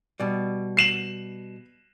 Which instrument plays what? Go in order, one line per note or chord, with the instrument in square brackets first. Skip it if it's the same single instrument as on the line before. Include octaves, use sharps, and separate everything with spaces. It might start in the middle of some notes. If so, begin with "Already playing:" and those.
[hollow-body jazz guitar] B2 G3
[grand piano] C7 E7 F#7